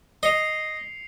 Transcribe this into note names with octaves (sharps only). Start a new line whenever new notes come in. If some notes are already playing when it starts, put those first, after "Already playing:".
D#5 C7 C#7 F7